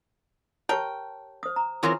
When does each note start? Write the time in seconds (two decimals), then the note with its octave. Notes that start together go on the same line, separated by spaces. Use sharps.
0.69 G4 A#4 C#5 G5 A5
1.43 C5 D#6
1.56 A#5
1.83 E3 C4 C#4 F4 G#4 A#4